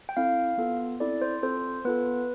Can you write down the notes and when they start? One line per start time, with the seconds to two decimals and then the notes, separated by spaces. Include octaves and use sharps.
0.09 G5
0.17 C4 E4 A4 F5
0.58 B3 F4 A4
1.00 C4 E4 A4 D5
1.22 C5
1.43 C4 F4 A4 C5
1.85 B3 F4 A4 B4